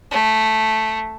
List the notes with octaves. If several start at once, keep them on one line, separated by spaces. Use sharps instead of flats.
A3